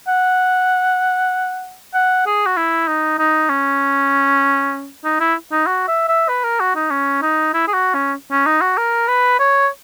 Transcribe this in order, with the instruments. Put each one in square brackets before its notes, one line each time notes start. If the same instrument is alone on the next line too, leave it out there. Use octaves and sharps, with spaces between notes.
[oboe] F#5
F#5
G#4
F#4
E4
D#4
D#4
C#4
D#4
E4
D#4
F#4
E5
E5
B4
A#4
F#4
D#4
C#4
D#4
E4
G#4
F#4
C#4
C#4
D#4
F#4
A#4
B4
C#5